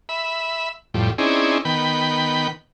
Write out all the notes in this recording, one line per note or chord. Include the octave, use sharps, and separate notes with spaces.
E5 B5
F2 A2 G3
C4 C#4 D#4 E4 G#4 D5
D#3 B3 G5 B5